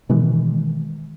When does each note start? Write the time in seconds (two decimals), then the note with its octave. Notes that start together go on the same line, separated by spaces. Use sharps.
0.09 B2 D#3 E3 G#3